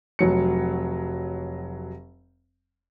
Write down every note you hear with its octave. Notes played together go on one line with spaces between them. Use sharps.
F1 F#3 C#7